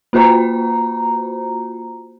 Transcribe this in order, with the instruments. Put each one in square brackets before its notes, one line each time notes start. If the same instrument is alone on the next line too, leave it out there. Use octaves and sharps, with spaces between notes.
[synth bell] A#3 F4 F#4 C5 A#5